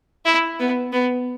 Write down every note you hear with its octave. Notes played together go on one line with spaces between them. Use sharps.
E4
B3
B3